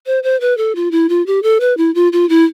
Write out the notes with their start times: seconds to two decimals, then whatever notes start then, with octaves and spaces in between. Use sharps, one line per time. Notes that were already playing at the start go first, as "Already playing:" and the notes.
0.06 C5
0.23 C5
0.41 B4
0.58 A4
0.75 F4
0.91 E4
1.09 F4
1.27 G4
1.43 A4
1.60 B4
1.77 E4
1.95 F4
2.13 F4
2.29 E4